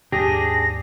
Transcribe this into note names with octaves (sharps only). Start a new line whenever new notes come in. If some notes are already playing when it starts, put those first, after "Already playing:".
D#2 G#2 D4 G4 G#4 A#6